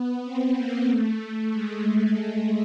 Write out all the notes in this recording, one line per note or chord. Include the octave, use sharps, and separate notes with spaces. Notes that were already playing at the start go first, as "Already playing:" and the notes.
Already playing: B3
C4
A#3
A3
G#3